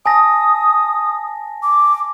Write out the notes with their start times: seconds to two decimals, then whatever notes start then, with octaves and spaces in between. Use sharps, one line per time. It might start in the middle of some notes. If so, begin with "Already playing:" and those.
0.06 G#5 A5 D#6 A#6
1.63 D6